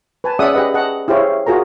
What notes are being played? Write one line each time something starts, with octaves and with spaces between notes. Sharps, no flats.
B4 G#5 A5
C#4 G#4 D5 E5 F#5 D#6
G4 G#4 B4 D#5 F#5
G#4 D#5 F#5 A5
E4 G4 G#4 C5 C#5 F5
F4 F#4 G#4 A#4 A#5